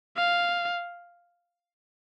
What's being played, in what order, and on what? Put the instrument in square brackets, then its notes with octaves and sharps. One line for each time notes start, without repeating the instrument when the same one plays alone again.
[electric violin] F5